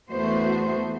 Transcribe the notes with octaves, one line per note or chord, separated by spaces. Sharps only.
E2 A3 B3 F#4 C5